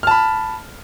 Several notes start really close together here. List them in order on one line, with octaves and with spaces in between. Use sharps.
F6 A5 B5